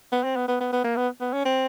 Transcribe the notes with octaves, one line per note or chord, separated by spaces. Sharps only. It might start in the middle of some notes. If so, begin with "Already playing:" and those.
B3
C4
B3
B3
B3
B3
A#3
B3
B3
C#4
C4